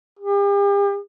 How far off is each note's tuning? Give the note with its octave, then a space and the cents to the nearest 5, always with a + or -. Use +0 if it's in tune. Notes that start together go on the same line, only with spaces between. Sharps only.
G4 +45